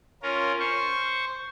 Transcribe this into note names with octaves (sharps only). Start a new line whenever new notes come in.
C#4 F4 A#4
C5 C#6